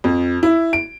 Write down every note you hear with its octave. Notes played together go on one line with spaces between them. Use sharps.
F2
E4
D7